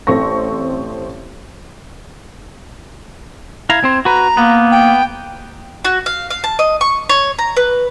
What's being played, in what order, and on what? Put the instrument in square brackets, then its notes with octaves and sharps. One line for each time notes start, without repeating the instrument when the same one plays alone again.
[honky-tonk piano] A1 C4 A4 C#6 A#6
[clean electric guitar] E4 F5 A#5 [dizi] G#6
[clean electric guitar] C4 C5
[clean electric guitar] F#4 B4 [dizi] A#5
[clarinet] A#3 [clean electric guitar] B3
[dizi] G5
[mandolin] F#4
F5
F5
A5
D#5
C#6
C#5
A#5
B4